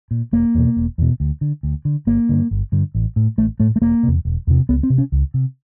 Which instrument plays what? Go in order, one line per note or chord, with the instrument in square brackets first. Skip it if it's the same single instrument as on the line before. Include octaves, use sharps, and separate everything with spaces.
[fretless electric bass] A#2
E1 A#3
E2 B2
E1
E2 B2
D2
D3
D2
D3
G1 A#3
G2 D3
G1
G2 D3
A1
A2
A1 A3
A2 A3
A3
E1 A#3
E2 C3
E1
E2 C3
C#2 B3
C4
C3
C#4
C#2
C3